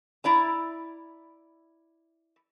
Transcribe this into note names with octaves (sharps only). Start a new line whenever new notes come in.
E4 D5 A#5